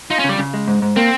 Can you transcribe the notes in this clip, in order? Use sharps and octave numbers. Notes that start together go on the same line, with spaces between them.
D#4 F4
C#4
C#3 G3
C#3
G#3
G#2
G#2
A#3 C4